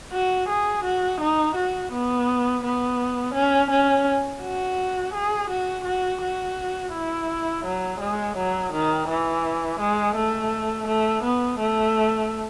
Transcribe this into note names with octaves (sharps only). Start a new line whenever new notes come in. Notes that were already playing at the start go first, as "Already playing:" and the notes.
F#4
G#4
F#4
D#4
F#4
B3
B3
C#4
C#4
F#4
G#4
F#4
F#4
F#4
E4
F#3
G#3
F#3
D#3
E3
G#3
A3
A3
B3
A3